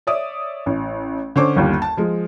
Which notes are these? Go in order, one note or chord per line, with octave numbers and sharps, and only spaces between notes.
C#5 D5 E5 D#6
A1
D3 C#4 C5 C#6 D6
G1 D#2 G3
A5
F3 G#3